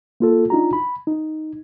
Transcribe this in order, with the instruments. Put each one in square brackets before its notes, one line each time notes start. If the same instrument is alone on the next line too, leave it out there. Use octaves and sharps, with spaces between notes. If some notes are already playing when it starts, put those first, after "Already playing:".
[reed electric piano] A#3 F4 A4
D4 D#4 F4 F#4 A#5
B5
D#4